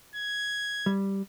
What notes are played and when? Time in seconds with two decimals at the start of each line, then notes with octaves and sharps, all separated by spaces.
0.16 G#6
0.86 G3